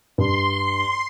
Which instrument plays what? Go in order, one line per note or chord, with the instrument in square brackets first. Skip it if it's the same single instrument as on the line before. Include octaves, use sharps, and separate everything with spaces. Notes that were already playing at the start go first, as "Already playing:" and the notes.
[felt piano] G2 [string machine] C6